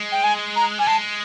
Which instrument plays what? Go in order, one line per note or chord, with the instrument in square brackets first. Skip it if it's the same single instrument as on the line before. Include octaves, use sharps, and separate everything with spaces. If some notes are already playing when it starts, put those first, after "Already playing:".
Already playing: [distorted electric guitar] G#3
[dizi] G5
G#5
A#5
[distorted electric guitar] G3 [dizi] G#5
[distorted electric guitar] G#3 [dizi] A5